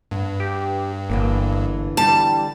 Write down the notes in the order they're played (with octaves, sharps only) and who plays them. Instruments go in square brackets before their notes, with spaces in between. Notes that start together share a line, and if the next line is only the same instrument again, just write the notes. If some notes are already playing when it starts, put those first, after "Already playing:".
[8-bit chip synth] G2 [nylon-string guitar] B3
[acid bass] G4
[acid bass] G1 [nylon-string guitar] D3 E3 A#3
[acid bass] G3 [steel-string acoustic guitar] A5